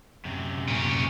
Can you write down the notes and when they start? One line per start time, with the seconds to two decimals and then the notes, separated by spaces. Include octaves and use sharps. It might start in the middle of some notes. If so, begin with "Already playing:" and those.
0.25 F#2 C3
0.68 A#2 C#4